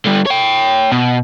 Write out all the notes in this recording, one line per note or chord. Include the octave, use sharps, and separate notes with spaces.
D3 G3
C#5 G5
B2